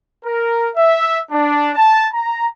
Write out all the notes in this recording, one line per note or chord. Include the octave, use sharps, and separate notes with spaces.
A#4
E5
D4
A5
A#5